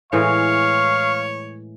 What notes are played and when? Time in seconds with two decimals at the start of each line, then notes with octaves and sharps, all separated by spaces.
0.13 A2 E3 G#3 C#5 F5 C#6